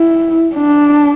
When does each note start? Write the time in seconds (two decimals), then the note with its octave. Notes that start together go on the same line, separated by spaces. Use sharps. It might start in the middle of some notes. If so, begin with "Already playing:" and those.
Already playing: E4
0.55 D4